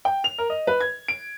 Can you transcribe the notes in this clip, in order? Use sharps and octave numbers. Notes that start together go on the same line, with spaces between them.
G5
F7
A#4
D#5
B4
G#6
D7